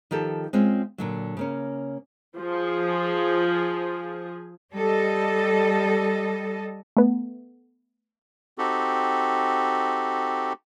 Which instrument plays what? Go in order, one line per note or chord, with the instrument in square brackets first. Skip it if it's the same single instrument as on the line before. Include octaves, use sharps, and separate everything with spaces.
[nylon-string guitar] D#3 F3 G4 A4
G#3 C4 C#4 F4
A#2 D3 F#3
C#3 A#3 C#4
[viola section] F3 G#4
[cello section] G3 A4 D#5
[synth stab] A3 B3
[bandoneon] C4 D#4 F#4 G4 A4